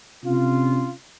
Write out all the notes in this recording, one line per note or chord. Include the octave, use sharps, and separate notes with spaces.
C3 C#4 F4